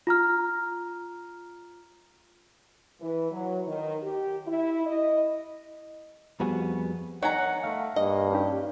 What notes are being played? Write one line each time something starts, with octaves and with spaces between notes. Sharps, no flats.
F4 A#5 F6
E3
F#3
D#3
G4
E4
D#5
F2 G3 B3 F#4 G#4
D#3 C#5 F#5 G#5 A#5
A3 F5
G2 A#3 D#5
C#4 D#4 G4